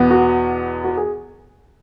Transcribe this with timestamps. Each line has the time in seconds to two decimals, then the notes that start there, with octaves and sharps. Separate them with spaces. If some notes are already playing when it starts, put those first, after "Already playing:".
Already playing: E2 B2 B3
0.11 F#4
0.84 F#4
0.97 G#4